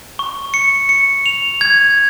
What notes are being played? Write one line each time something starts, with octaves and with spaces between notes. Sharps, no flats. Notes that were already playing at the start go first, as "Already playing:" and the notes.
C#6
C#7
C#7
F7
G#6